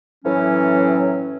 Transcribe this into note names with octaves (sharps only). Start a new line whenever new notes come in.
A2 E3 F#3 C#4